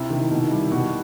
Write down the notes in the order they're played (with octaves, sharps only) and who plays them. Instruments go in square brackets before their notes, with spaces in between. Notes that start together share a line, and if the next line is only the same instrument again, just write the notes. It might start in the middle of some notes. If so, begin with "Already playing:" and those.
Already playing: [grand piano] C3 E4
D#3
B2
G3
B2 F#4